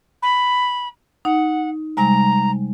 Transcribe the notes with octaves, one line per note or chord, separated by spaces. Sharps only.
B5
D#4 F#5
C3 G3 G#3 A#5